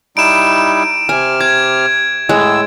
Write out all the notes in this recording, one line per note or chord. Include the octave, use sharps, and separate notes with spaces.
G3 D#4 E4 D7 E7
C3 G#5 F6
D6 G#6
A2 G#3 E6